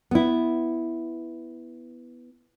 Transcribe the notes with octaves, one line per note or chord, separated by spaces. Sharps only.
B3 E4